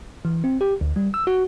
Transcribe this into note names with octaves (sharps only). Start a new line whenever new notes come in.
E3
C4
G4
D2
G3
E6
F#4